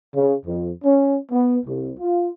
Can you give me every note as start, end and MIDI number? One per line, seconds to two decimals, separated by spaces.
0.14 0.34 49
0.46 0.71 41
0.84 1.17 61
1.31 1.58 59
1.66 1.92 36
2.00 2.29 65